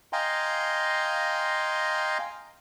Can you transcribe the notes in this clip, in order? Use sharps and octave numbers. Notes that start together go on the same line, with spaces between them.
D#5 F5 G5 G#5 A#5 C6